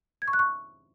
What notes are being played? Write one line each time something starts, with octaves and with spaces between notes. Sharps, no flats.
G#6
C#6
F#6
C#6